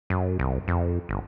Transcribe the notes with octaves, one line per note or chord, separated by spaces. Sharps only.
F#2
C2
F2
G1